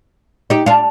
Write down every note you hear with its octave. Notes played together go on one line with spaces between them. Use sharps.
D#4 G4
D4 F4